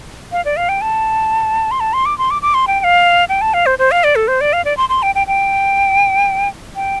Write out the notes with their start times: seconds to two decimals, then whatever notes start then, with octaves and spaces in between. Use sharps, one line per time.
0.32 F5
0.45 D5
0.57 F5
0.69 G5
0.81 A5
1.71 C6
1.80 A5
1.93 C6
2.06 D6
2.18 C6
2.31 D6
2.42 D6
2.54 C6
2.67 G5
2.80 G5
2.84 F5
3.29 G5
3.41 A5
3.54 F5
3.66 C5
3.79 C5
3.91 F5
4.04 D5
4.16 A4
4.28 C5
4.41 D5
4.53 F5
4.65 D5
4.77 C6
4.89 C6
5.03 G5
5.15 G5
5.27 G5
6.76 G5